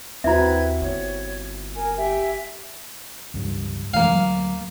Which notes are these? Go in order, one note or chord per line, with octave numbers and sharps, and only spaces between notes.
D#2 C4 E4 F#4 B4 E5 A#5 G#6
G1 C#5
A#4 G#5
G4 E5 G#5
C#2 G2
F#2 E3 A#3 C#4 F5
D2 F#3